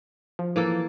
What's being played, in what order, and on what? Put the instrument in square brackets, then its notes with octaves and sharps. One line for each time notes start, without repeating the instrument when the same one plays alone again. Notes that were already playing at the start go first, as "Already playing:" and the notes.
[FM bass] F3
[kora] E3 A#3 A4